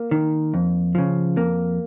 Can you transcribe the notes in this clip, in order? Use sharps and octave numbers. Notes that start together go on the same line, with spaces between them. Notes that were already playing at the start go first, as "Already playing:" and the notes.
Already playing: A#3
D#3
F2
C#3 F3
F2 A#3